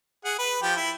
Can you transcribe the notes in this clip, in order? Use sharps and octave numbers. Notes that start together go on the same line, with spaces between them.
G#4 F#5
B4
F3 G4 G5
E4